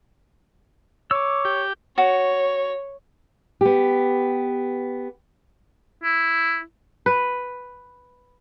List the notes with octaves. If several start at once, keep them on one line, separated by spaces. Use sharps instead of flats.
C#5 D6 E6
G4
F#4 C#5
B3 G4
E4
B4